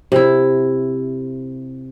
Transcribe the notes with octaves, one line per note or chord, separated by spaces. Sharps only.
C3 E4